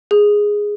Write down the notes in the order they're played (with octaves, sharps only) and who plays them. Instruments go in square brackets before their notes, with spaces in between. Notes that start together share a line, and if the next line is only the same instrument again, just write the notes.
[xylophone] G#4